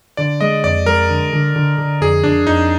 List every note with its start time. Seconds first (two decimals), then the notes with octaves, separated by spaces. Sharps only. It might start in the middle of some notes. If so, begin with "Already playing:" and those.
0.17 D3 D5
0.41 G#3 D#5
0.64 F2 D5
0.86 G#3 A#4
1.10 D3
1.33 D3
1.56 D3
1.78 D3
2.01 F2 G#4
2.24 F2 D4
2.47 F2 D#4